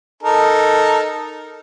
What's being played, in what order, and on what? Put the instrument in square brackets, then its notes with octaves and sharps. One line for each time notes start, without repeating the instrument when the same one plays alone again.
[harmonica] D#4 A4 A#4